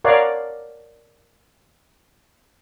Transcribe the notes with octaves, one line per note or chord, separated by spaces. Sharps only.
A#4 C#5 D5 F5 F#5